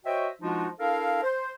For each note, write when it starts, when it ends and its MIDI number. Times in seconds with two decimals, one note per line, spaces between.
0.05 0.28 66
0.05 0.28 72
0.05 0.28 73
0.05 0.28 75
0.05 0.28 76
0.05 0.28 79
0.42 0.67 53
0.42 0.67 56
0.42 0.67 62
0.42 0.67 63
0.42 0.67 65
0.42 0.67 66
0.79 1.22 62
0.79 1.22 64
0.79 1.22 69
0.79 1.22 70
0.79 1.22 77
1.23 1.53 72